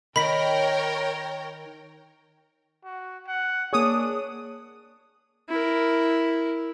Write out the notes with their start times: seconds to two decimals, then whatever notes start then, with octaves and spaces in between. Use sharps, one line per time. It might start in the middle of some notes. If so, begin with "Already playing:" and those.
0.16 D#3 A#4 C#5 G5 B5 B6
2.84 F#4
3.27 F#5
3.73 A#3 D4 G#4 C#5 D#6
5.49 E4 A#4